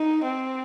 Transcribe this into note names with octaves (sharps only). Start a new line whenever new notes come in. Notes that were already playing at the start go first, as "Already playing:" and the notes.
Already playing: D#4
C4